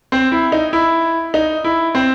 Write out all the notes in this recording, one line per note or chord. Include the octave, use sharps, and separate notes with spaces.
C4
E4
D#4
E4
D#4
E4
C4